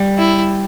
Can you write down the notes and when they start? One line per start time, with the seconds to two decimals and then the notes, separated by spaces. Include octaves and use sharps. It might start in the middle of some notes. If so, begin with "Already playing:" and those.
Already playing: G3
0.18 E4